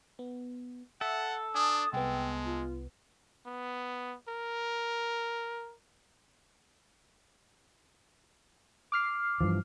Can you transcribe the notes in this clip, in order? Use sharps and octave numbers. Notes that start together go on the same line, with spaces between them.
B3
A4 E5 F#5
D4 G#5 D#6
C2 G#3 B3 G5
F4
B3
A#4
D6 F6 C7
G2 E3 F3